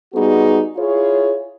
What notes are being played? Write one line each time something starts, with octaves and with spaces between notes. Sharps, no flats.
G3 B3 D#4 F#4 G#4
E4 F4 G#4 C#5